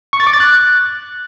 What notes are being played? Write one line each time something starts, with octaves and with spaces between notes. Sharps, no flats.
C#6
A6
D6
A6
F#6